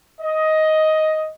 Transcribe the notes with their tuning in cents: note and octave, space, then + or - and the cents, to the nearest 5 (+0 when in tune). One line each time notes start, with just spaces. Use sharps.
D#5 +10